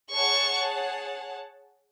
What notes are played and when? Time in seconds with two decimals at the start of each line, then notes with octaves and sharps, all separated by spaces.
0.11 G#4 C#5 F#5 A5 C#6